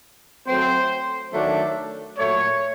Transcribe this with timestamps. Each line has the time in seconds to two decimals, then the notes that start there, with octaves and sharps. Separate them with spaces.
0.47 F#3 A3 C4 C5
1.32 D#3 F#3 A3 D4
2.18 A#2 F#3 A3 C#5